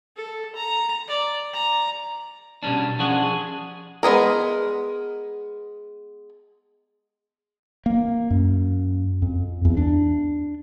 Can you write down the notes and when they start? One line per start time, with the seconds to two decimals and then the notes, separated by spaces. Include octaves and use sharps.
0.17 A4
0.56 A#5
1.08 D5
1.53 A#5
2.63 B2 G3 C#4 D4
2.99 F3 C#4 D4 G#4 F#5
3.23 G#4
4.03 G#3 B3 G#4 A#4
7.86 A#3
8.30 F#2
9.22 F2
9.65 E2
9.77 D4